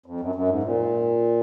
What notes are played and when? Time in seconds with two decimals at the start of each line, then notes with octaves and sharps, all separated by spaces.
0.06 F2
0.20 F#2
0.35 F#2
0.48 G#2
0.63 A#2